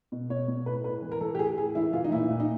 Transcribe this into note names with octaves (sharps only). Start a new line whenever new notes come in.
B2
B2 C#5
B2
A2 B4
A2 B4
E3
A#4
E3 A4
G4
A2 G#4
A2 G#4
E3 E4
E3 F4
D#4
A#2 E4
A#2
D#4